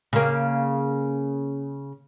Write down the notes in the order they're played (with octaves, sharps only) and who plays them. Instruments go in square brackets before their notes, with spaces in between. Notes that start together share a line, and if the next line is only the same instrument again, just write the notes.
[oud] C#3 A#3